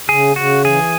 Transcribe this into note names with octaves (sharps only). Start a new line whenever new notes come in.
C#3 G#4
C#3 F#4
E3 G#4